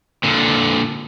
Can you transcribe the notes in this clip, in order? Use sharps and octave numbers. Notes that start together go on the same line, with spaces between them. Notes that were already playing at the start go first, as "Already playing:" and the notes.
A#2 D3